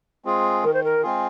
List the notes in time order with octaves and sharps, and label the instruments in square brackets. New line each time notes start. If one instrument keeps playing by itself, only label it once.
[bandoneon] G#3 C4 F4 G#4
[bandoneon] D#3 [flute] A#4
[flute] C5
A#4
[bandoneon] G#3 C4 F4 G#4